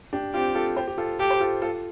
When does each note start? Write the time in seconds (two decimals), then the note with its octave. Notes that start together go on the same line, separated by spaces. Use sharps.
0.13 D4 G4
0.33 C4 F4 G4
0.55 F4 A4
0.77 G4 C5
0.87 G4
0.98 F4 A4
1.19 F4 G4 A4
1.30 C5
1.40 F4 A4
1.62 F4 A4